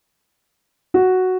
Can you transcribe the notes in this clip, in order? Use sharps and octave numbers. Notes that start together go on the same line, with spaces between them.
F#4